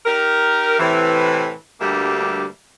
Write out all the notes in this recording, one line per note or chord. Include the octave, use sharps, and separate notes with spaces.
D#4 G4 A#4
A2 C3 E3
D2 G2 G3 A#3 E5